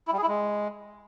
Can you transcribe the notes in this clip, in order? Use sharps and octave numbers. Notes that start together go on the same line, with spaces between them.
E4
G3
G#4
E4
G#3